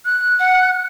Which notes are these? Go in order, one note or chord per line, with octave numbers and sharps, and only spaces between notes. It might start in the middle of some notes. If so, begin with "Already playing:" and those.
F#6
F#5